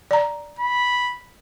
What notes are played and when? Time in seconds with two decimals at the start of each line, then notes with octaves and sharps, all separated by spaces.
0.11 D5 A#5
0.59 B5